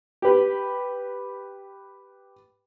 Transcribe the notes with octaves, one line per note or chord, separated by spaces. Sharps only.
G4 B4